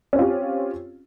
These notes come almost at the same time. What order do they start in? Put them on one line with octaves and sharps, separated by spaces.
C#4 C4 F4 G4